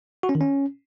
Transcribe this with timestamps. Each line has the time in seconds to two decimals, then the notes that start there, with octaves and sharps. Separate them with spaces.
0.23 F#4
0.29 C#4
0.35 D#3
0.41 C#4